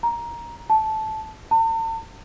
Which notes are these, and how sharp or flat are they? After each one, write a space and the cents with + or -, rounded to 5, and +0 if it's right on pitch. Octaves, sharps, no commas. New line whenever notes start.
A#5 +10
A5 -10
A5 +45